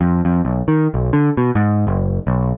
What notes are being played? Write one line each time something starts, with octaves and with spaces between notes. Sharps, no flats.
F2
F2
B1
D#3
B1
D3
B2
G#2
F#1
B1